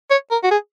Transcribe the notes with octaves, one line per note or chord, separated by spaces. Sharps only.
C#5
A#4
F#4
G#4